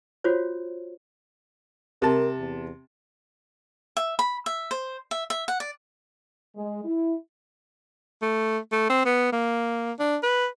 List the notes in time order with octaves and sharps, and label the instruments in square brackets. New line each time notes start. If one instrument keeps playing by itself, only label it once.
[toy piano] F4 F#4 C5 C#5
[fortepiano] C3 A5 [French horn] A#4
[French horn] E2
[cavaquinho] E5
B5
E5
C5
E5
E5
F#5
D5
[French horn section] G#3
E4
[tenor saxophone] A3
A3
C4
B3
A#3
D4
B4